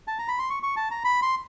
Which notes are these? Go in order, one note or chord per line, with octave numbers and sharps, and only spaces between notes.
A5
A#5
B5
C6
C#6
C#6
A5
A#5
B5
C6